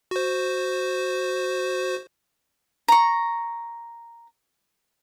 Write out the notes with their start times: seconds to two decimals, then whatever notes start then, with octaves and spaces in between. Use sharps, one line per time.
0.11 F#4 C5
2.88 A#5 C#6